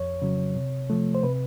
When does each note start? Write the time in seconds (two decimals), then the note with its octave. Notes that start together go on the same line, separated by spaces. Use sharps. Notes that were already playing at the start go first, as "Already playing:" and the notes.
Already playing: F2 C#5
0.22 C#3 F#3
0.56 C3
0.90 F3 A3
1.15 C5
1.23 C3 B4